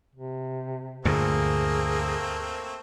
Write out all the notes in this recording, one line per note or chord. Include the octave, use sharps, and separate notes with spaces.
C3
D2 G2 A#2 A3 A#3 C4 G#4